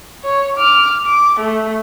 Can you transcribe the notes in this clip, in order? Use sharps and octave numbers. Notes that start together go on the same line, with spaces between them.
C#5
D6 F6
D6
A3